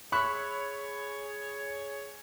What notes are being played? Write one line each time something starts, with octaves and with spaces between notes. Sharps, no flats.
G#4 C#5 E5 B5 C#6 F#6